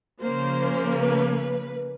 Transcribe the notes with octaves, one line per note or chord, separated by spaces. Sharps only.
C#3 F3 A#3 C5
B4
B4